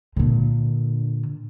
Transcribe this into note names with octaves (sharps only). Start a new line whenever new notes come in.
A#2 D3